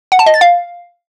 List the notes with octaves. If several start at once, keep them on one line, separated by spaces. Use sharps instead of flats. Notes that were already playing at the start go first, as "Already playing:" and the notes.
F#5
A5
D#5
A6
F5